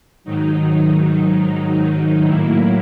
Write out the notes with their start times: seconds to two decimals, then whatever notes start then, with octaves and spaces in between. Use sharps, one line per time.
0.24 G#2 D#3 F#3 D#4
1.74 D#4
2.24 A2 F#3 A#3 E4